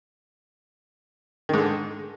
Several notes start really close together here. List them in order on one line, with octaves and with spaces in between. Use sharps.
D#3 G#2 D3